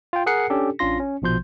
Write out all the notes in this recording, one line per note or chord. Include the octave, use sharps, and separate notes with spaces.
F4 G5
G#4 A#4 F#5 F#6 C7 C#7
C#4 D4 G4 A4
A1 C#4 D4 F4 C6 A#6
C#4
A#1 B2 F3 C6 G6